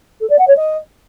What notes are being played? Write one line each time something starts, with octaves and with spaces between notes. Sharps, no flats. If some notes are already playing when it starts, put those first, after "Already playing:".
A4
D5
F#5
C#5
D#5